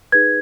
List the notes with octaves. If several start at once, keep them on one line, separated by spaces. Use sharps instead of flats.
D#4 G#4 B4 G#6